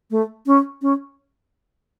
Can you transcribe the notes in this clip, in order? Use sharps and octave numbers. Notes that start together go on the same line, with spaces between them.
A3
C#4
C#4